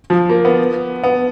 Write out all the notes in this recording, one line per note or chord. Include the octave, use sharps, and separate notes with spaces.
F3
A#3
B3
B3